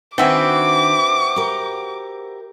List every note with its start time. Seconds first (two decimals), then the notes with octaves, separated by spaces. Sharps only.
0.18 D#3 C4 D4 F#4 B4 E5 G#5 D6
1.36 G4 A#4